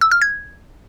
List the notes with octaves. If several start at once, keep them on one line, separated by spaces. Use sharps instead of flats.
E6
F6
G#6